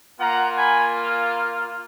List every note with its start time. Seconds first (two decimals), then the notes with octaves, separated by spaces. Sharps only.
0.20 A#3 F4 F#5 A#5
0.58 G#5 B5